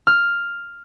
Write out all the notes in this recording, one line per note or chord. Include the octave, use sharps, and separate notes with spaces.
F6